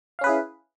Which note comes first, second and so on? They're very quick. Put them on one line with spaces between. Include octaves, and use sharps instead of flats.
F5 C#4 B4 G#4 E4